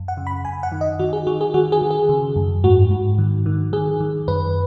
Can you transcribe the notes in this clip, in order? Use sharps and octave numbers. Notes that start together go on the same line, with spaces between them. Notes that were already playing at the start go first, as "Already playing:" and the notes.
Already playing: F#2
F#5
C#3
B5
F#2 G#5
F#5
D#3
D#5
D#3 F#4
G#4
D#3 F#4
G#4
D#3 F#4
G#4
D#3
G#4
C#3
F#2
G#2 F#4
G#2
D#3
D#3
D#3 G#4
D#3
F#2 B4